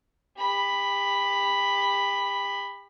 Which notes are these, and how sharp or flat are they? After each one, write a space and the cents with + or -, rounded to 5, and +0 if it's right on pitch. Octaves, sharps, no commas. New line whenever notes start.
G4 +35 B5 +5